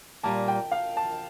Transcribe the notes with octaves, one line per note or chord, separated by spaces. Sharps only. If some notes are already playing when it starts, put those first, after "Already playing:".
A#2 G3 A#3 A5
G5
F5
A5